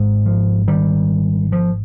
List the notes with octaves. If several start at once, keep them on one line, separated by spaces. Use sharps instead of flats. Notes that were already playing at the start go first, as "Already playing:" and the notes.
Already playing: G#1 G#2 G#3
F3
D#3 G3
F3